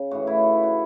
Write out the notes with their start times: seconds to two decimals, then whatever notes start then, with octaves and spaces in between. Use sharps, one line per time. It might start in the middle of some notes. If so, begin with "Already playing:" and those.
Already playing: C#3
0.11 A2 E3 F#4
0.27 E4
0.43 F#4
0.53 E4
0.63 F#4